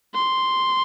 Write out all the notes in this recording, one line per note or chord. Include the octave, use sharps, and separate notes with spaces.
C6